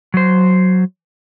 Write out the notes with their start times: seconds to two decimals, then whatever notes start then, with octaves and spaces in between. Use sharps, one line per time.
0.14 F#3 C5